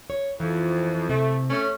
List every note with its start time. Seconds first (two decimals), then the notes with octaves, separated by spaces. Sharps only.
0.10 C#5
0.40 F2 E3
1.09 C3 A3
1.50 A3 C#4